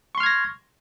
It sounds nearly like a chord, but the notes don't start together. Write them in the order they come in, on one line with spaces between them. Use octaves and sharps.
C#6 C6 F6 G#6 A#6